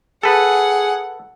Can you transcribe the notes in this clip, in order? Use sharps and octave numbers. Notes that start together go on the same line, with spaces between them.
G#4 A4 B4 F#5